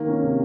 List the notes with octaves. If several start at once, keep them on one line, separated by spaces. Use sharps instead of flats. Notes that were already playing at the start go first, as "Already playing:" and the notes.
Already playing: D#3 A#3
C#4
C3